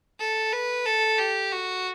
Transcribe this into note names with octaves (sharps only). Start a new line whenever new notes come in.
A4
B4
A4
G4
F#4